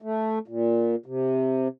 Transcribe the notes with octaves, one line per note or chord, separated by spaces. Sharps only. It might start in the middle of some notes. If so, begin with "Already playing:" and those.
A3
A#2
C3